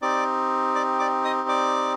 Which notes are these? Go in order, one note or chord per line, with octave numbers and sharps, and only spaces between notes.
C4 D#4 G4 D5 D6
D5 D6
D5 D6
D#5 D#6
D5 D6